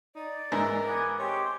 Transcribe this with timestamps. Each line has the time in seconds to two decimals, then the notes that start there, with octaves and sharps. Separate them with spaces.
0.15 D#4 D5
0.52 G#2 E3 A#4
0.86 B3 G#5 D6
1.19 G#3 C4 G4 C#5 C6